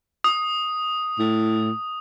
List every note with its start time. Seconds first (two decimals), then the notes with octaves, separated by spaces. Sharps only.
0.24 D#6
1.19 A2